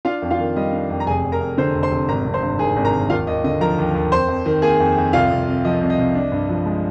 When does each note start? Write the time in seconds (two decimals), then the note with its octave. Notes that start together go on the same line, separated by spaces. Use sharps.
0.05 D4 F4 F5
0.22 F2
0.30 F4 F5
0.39 D#3
0.56 G3 D#5
0.73 D4
0.90 F2
1.00 A#5
1.07 F1 G#4 G#5
1.24 F1
1.32 A#4 A#5
1.41 F2
1.58 D3 C5 C6
1.75 F1
1.83 C5 C6
1.91 F1
2.08 G#1 A#4 A#5
2.26 G#1
2.34 C5 C6
2.42 G2
2.59 D#3 G#4 G#5
2.76 G#1
2.84 A#4 A#5
2.93 G#1
3.10 D#2 F4 F5
3.27 D#2 D#5
3.44 D3 D#5
3.61 F3 A#4 A#5
3.78 D#2
3.95 D#2
4.12 F2 C5 C6
4.28 F2
4.46 D#3
4.62 A#3 G#4 G#5
4.80 F2
4.97 F2
5.13 C2 F4 F5
5.31 C2
5.48 C3
5.65 F3 D#5
5.81 C2
5.90 D#5
5.98 C2
6.15 D4
6.32 G2
6.49 F3
6.66 G#3